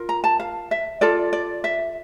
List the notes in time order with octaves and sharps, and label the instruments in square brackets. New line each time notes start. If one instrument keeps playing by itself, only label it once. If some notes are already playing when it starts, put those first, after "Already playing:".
Already playing: [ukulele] F4 A#4
A#5
A5
F5
E5
F4 A4 D5
D5
E5